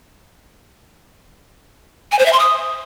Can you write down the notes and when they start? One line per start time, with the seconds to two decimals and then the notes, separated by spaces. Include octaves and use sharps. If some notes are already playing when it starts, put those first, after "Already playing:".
2.12 G#5
2.19 C5
2.26 E5
2.33 C6
2.40 D#6